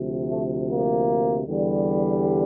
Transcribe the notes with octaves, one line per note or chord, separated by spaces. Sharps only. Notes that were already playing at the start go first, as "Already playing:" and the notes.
Already playing: D2 C3 F3
A3
A#3
E2 D3 G3